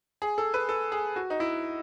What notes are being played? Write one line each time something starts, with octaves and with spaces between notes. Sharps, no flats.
G#4
A4
B4
A4
G#4
F#4
D#4
E4